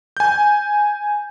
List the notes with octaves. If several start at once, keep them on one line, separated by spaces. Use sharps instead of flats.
G#5 G6